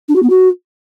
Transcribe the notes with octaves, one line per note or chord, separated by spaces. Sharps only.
D4
F#4
B3
F#4